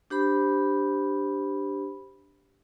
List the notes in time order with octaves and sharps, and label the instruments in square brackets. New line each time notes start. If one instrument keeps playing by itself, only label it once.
[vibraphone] D4 G4 C5 B5